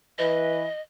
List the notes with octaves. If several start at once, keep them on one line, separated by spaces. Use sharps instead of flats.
E3 B4 D#5